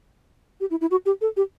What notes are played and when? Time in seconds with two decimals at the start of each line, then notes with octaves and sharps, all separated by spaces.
0.60 G4
0.71 E4
0.81 E4
0.91 F#4
1.06 G4
1.21 A4
1.37 G4